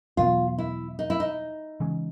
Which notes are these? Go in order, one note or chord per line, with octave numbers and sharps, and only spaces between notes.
E2 B2 F#3 B3 F4
E4
D#4
E4
D#4
C#3 E3 G#3 C#4